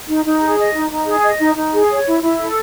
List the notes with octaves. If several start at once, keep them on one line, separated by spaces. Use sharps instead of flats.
D#4
D#4
G#4
D#5
D#4
D#4
G#4
D#5
D#4
D#4
G#4
C#5
E4
E4
A4